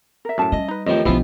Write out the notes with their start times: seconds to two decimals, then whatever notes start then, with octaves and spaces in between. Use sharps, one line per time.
0.25 A#4 E5
0.38 F#2 A2 C#4 E5 A5
0.52 G3 D#5
0.69 D#4 B4
0.87 F2 A2 D#3 F3 G4 D#5
1.05 B1 E3 F3 B3 D4 E4 F4